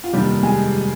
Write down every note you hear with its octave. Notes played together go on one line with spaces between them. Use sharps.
F4
F1 D#2 D#3 G3 G4
G#3 G#4